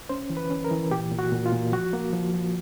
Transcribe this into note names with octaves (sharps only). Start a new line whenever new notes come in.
C#4 C5
E3
B4
C#4
A#4
E3
A#2 G4
A#2
F#4
A#2
F4
A#2
F3 F#4
A#3
F3
F3